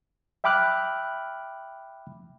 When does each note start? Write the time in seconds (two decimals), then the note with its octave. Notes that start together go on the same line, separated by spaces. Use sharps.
0.44 E5 G5 B5 D6 F6 F#6